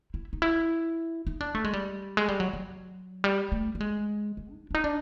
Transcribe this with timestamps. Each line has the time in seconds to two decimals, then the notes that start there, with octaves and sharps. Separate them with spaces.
0.14 E4
0.33 D#4
0.42 E4
1.27 D#4
1.41 D4
1.55 A3
1.64 G#3
1.73 G3
2.17 G#3
2.28 G3
2.40 F#3
2.53 F#3
3.24 G3
3.52 A3
3.75 A3
3.80 G#3
4.37 A3
4.51 D#4
4.71 D4
4.75 D#4
4.84 D4